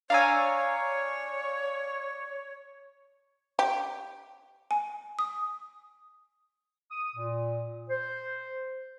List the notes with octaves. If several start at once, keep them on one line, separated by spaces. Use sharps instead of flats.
D4 C#5 F5 G#5 A#5 E6
G4
G#5
D#6
D#6
A#2
C5